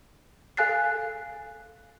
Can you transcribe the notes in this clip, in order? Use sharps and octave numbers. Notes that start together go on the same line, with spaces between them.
A4 F5 G#5 F#6 A6 C7